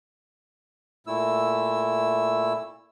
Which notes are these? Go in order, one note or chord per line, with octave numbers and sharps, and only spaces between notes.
A#2 A3 E4 E6